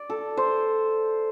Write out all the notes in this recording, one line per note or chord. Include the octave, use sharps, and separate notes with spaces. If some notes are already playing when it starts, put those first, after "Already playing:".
Already playing: D5
A4
C5